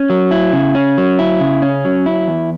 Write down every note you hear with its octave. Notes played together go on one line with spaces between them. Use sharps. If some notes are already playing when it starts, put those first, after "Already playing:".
Already playing: C#4
F#3
E4
C#3
C#4
F#3
E4
C#3
C#4
F#3
E4
E2